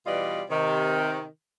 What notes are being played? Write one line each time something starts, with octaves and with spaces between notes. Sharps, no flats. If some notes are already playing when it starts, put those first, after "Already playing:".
B2 E3 G3 F4 D5 D#5
C3 D#3